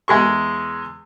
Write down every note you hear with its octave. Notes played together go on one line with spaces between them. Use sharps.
E2 G#3 G#4 C#6